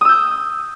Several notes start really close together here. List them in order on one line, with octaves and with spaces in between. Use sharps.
D#6 E6 G6